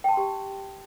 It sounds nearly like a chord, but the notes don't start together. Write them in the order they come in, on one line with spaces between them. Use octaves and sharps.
G5 A5 C6 G4